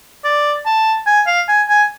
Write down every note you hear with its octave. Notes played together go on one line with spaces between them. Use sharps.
D5
A5
G#5
F5
G#5
G#5